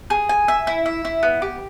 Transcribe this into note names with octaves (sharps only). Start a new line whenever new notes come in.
G#4
G#5
E5
E4
E5
E4
B3
G4